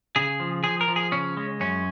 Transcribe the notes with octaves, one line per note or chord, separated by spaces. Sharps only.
C#3 G#4
F3
F3 G#4
A#4
F3
G#4
C#3 C#4
G#3
F#2 C#4